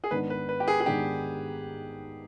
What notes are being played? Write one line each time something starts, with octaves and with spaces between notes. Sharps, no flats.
G#4
G#2 D#3 B3 D4 B4
B4
B4
G4
G#4
G#4
G#2 D#3 B3 D4 G4